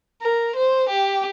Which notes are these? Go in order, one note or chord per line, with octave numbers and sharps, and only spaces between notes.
A#4
C5
G4